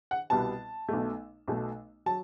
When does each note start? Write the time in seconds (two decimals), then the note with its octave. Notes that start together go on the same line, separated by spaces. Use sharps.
0.11 F#5
0.30 C2 B2 G3 B3 A5
0.89 B1 B2 A3
1.48 B1 B2 A3
2.06 F#3 A5